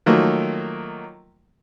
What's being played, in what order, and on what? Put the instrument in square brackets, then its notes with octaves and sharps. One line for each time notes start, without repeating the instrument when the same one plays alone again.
[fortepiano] D#3 F3 F#3 A3 A#3